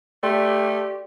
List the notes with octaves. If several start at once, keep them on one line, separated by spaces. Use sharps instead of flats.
A3 G4 D5 G5 C6